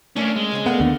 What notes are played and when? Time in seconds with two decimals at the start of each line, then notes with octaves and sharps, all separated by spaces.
0.16 A3 C#4 D4 A#4 F5
0.36 G#3
0.52 C#3 C4 C#4
0.66 A3 B3 A#4 D5 F5 F#5
0.80 D#2 D3